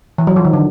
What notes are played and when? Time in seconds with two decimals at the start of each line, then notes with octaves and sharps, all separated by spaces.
0.18 E3
0.27 F#3
0.36 F3
0.45 D#3
0.53 D3